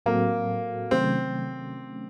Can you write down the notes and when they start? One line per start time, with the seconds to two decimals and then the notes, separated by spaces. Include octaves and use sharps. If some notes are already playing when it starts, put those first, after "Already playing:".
0.06 A2 F#3 A#3 C4 F#4 A4
0.91 C3 D#3 F#3 A3 C4 C#4